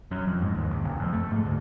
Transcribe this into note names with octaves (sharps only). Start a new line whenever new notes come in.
F#2
F2
G#2
D#2
C#2
F#1
F2
A3
G#2
D2